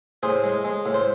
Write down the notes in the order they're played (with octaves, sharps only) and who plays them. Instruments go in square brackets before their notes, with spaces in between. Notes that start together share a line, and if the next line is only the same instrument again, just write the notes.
[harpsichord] A2 G#4 C5
G#3
G#3
A2
C5